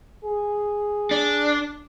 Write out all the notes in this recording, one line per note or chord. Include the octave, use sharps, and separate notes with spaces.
G#4
D4